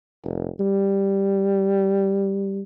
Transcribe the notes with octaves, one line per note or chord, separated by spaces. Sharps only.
F1
G3